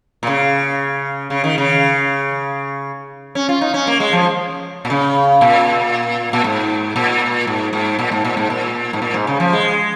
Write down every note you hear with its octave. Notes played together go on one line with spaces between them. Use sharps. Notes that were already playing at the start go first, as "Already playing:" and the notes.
A#2
C#3
C#3
D#3
C#3
C#4
F4
D#4
C#4
A#3
G#3
F3
A#2
C#3
A#2
A#2
G#2
A#2
G#2
G#2
A#2
G#2
A#2
G#2
A#2
G#2
A#2
G#2
C#3
F3
G#3